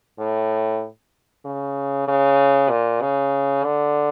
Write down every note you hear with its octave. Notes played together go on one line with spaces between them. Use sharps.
A2
C#3
C#3
A#2
C#3
D3